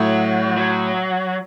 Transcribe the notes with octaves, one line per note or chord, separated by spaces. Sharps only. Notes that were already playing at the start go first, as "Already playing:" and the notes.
Already playing: A2 F#3
F#3